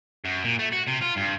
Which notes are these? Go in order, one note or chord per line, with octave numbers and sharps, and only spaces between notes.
F#2
A#2
A3
F#4
C3
F4
G2